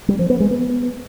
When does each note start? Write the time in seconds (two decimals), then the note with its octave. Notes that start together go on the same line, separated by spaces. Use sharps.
0.08 G3
0.19 F3
0.30 B3
0.40 G#3
0.51 B3